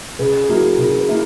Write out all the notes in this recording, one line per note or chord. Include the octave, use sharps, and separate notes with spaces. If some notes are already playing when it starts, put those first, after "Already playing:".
C#3 G#4 B4
G#4
F#3 A#3 E4 F#4 A#4
C#3 F#4 A#4
G#4 B4
A#3 E4